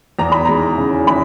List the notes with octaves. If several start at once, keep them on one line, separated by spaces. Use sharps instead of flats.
E2 A#5
B5
G#3 A#5
C#3
E3 B5